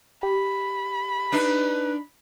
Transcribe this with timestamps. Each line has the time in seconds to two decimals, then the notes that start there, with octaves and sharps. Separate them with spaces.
0.23 G4 B5
1.32 D4 D#4 B4